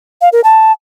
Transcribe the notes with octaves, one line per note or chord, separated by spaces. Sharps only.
F5
A#4
A5